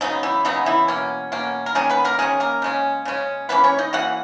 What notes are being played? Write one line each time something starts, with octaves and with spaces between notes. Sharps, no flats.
C#3 F#3 B3 D#4
E3 E4
C#3 F#3 B3 D#4
E3 E4
B2 A#3 C#4
B2 A#3 C#4
A#4
D#3 G#3 A#3 C#4 G#4
B3 B4
A#3 A#4
D#3 G#3 A#3 C#4 G#4
A#3 A#4
C#3 G#3 C#4
C#3 G#3 C#4
E3 A#3 B3 C#4 B4
C#4 C#5
D#4 D#5
E3 A#3 C#4 F#4 F#5